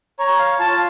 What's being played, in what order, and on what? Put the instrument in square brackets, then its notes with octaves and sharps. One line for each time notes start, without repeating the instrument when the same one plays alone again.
[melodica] C#5 [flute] A#5
[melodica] F5
[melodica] F4 [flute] A5